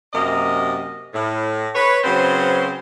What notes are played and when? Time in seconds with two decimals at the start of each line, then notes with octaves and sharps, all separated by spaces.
0.13 F#2 C3 A#3 D#5
1.14 A2
1.75 B4 C#5
2.04 C#3 F#3 C4 B4 C5